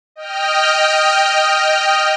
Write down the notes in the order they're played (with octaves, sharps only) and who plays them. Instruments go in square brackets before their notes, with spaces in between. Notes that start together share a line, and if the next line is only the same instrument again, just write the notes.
[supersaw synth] D#5 G5 F6